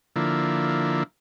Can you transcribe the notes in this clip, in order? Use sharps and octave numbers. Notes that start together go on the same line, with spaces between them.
D3 F3 A#3 E4